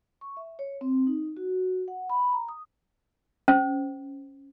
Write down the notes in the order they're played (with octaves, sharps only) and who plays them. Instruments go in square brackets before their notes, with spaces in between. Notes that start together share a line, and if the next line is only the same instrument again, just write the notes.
[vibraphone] C#6
E5
C#5
C4
D#4
F#4
F#5
B5
A#5
D#6
[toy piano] C#4 C5